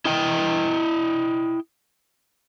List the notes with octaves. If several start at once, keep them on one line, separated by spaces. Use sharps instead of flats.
E4 D#5 G5